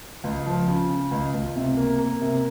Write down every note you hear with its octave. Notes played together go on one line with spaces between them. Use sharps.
C#2
F3
C#3
C#3
C#2
C#2
C3
A#3
A#3
C3